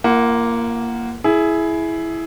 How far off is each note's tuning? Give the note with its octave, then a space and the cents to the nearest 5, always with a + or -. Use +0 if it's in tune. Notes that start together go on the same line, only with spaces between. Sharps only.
A#3 +0 F4 -40 F#5 +10
E4 +0 G#4 +15